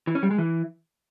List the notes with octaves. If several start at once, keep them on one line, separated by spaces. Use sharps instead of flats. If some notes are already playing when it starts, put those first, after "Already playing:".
E3
C#4
G3
G#3
E3